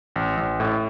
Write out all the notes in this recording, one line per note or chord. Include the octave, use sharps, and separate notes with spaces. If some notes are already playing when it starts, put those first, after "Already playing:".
A1
A1
A2